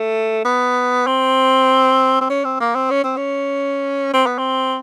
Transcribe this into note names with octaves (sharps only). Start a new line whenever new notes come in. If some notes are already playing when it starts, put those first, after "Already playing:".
Already playing: A3
B3
C4
C4
C#4
C4
A#3
C4
C#4
C4
C#4
C4
B3
C4